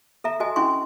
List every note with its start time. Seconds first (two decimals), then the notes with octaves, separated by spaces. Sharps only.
0.24 A4 E5 A#5
0.40 F#4 A4 D#5 G#5
0.56 C#4 D4 E4 G#5 C6 C#6